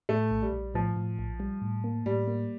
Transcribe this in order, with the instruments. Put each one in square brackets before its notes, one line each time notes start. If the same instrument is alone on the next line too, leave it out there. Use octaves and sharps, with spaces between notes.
[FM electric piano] A2 [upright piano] A3
[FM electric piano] A#1
[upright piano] G3
[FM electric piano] A#1
[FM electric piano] A2 [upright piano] F3
[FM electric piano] A2
A#1
G3
A2
A#3
[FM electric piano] A2 [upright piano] G3
[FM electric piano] A#3